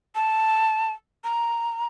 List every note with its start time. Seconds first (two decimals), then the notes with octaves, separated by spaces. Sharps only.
0.15 A5
1.24 A#5